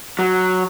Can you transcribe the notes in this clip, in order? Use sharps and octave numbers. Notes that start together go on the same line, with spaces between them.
F#3